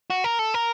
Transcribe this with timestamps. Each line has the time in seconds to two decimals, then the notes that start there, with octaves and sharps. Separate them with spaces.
0.10 F#4
0.24 A#4
0.39 A4
0.54 A#4